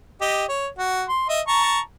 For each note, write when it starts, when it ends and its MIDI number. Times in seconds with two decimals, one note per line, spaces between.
0.21 0.44 67
0.21 0.44 75
0.49 0.68 73
0.79 1.05 66
1.09 1.25 84
1.29 1.41 75
1.29 1.41 76
1.48 1.80 81
1.48 1.80 82
1.48 1.80 85